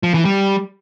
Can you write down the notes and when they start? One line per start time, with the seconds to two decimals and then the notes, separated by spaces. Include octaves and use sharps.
0.03 F3
0.14 E3
0.25 G3